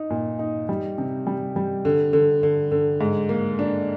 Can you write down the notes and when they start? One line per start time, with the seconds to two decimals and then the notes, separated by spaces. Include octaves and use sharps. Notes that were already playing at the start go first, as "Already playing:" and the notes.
Already playing: D#4
0.10 A#2
0.39 D#4
0.69 G3
0.98 C3
1.27 G3
1.56 G3
1.85 D3
2.13 D3
2.43 D3
2.72 D3
3.01 G#2
3.29 A#3
3.59 D4